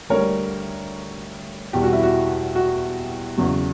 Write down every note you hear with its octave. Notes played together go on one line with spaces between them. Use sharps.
D2 D3 G3 A#4 C#5
E2 B2 G3 G4
F#4
E4
F#4
F#4
E2 C#3 F#3